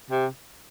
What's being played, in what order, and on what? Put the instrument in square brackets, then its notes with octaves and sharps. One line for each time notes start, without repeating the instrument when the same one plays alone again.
[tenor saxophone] C3